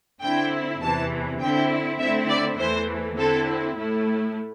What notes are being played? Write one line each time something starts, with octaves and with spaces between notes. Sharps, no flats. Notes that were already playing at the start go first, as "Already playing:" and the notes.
D3 C4 E4 G5
E2 C3 E3 A5
D3 C4 E4 G5
D3 A3 C4 E4 E5
D5
E2 E3 A3 C5
D3 C4 E4 A4
A2 A3 E4